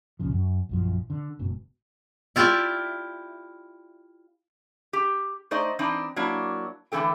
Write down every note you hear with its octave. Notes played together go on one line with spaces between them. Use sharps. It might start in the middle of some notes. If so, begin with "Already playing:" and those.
C2 A#2 C#3 F3
F#2
A#1 F#2 F3
D3
F#1 G#2 B2
E4 F4 G4 D5 E5
G4
A3 D#4 C5 D5 D#5
E3 C4 D4 D#4
F#3 A#3 D4 E4
A2 D3 E3 C4 A4 G5